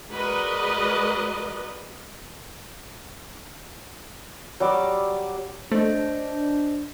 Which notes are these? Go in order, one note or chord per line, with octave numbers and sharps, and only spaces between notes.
G#3 F#4 A#4 B4 D5 D#5
F#3 G3 D5
A3 D4 C5 D#5